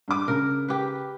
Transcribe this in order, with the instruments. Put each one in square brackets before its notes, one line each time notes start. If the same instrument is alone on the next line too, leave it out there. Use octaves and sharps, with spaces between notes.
[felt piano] G2 D6
[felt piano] C#3 [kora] A#4
[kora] G4 B4